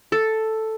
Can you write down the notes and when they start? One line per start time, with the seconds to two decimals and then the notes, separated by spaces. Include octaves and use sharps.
0.12 A4